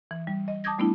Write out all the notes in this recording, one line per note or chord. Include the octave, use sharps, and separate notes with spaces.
E3
G3
D#5
A5 D6 D#6 G6 G#6 A#6
G3 A3 B3 D4 E4